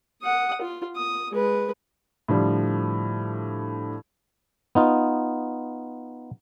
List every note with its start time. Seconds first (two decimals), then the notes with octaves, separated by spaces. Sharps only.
0.22 F#5 D#6
0.61 F4
0.96 D#6
1.32 G#3 B4
2.28 A2 D3 F3 G3
4.75 B3 D#4 F4